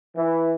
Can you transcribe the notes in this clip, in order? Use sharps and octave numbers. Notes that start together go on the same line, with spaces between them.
E3